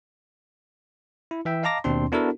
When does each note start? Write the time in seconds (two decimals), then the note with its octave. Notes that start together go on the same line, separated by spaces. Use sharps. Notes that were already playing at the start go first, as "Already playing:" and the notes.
1.31 E4
1.45 E3 E5 G5
1.63 D#5 F5 A5 A#5 D6 A#6
1.84 D#2 B2 C4 D4 C6
2.12 B3 D4 E4 F#4 A4 A#4